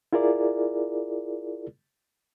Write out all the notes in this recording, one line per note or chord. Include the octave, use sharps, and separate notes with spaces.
E4 F4 G#4 A#4 D5